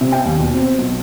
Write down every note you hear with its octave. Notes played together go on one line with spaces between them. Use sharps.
C3
G5
D#2
B2
C4
B1